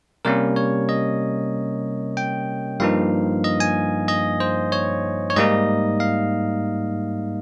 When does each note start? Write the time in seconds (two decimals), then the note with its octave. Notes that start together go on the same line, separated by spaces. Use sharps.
0.25 C3 G3 A#3 C#4 A#4
0.56 C#5
0.89 D#5
2.17 G5
2.80 G2 F3 A#3 D#4 F5
3.44 D#5
3.60 G#5
4.08 D#5
4.40 C5
4.72 C#5
5.30 C#5
5.36 G#2 G3 A#3 D#4 D#5
6.00 F5